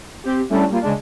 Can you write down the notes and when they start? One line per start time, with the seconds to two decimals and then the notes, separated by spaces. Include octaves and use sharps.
0.24 C4 G4
0.50 G3 A3 C#4 D4 E4
0.69 G3 A#3 F4
0.81 C#3 G#3 D4